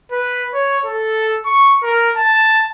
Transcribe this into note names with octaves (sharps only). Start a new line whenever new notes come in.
B4
C#5
A4
C#6
A#4
A5